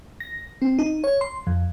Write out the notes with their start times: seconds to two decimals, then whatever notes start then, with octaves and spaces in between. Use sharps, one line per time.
0.20 A#6
0.62 C4
0.79 D#4
1.04 C#5
1.21 C6
1.47 F2